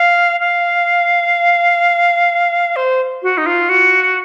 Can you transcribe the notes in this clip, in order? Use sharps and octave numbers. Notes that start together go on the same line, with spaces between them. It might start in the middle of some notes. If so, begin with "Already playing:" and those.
Already playing: F5
F5
C5
F#4
D#4
F4
F#4